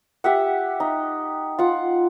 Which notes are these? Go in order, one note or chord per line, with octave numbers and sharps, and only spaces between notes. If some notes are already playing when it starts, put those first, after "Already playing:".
G4 E5 F#5
D#4
F4 F#5